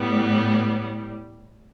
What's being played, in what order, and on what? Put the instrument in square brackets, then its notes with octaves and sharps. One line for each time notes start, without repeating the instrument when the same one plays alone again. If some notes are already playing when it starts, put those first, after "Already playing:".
Already playing: [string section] A2 G3 B3